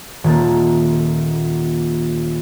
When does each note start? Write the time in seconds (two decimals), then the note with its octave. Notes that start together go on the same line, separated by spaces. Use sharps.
0.24 D#1 A#3 A4